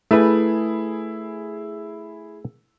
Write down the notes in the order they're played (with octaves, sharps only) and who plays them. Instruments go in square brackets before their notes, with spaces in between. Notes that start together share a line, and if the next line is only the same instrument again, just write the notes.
[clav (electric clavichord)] A3 B4 [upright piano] E4 G#4